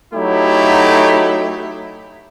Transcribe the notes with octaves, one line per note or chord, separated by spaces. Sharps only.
F#3 A3 D#4 E4 G4